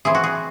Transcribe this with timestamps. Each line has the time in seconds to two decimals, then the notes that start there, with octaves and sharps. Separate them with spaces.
0.05 E3 C4 E4 G#4
0.15 F#4
0.24 G#4